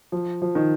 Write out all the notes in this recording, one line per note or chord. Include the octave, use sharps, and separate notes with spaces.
F3
F3
D#3